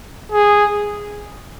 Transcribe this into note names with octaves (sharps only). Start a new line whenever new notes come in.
G#4